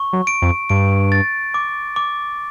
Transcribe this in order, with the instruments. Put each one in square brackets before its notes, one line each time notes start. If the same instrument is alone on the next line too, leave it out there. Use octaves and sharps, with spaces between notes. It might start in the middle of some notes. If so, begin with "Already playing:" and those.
Already playing: [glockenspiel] C#6
[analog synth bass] F#2
[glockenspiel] D7
[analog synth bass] F2
[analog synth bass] G2 [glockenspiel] D7
[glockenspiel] A6
D6
D6